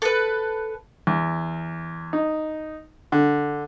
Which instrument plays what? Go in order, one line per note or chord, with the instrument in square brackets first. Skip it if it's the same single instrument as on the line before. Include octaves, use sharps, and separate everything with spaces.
[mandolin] A4 B4
[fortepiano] E2
D#4
D3